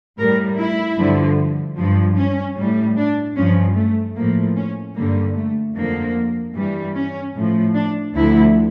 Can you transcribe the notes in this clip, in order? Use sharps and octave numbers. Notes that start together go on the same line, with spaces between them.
A2 G3 A#4
E4
G2 D3 F3
G2 F3
C#4
A2 G3
D4
G2 F3 C#4
A3
A2 F3 A#3
C#4
G2 D3 G3 A#3
A3
F2 D3 F3 A#3
G2 E3 G3
C#4
A2 F3
D4
D2 D3 F3 E4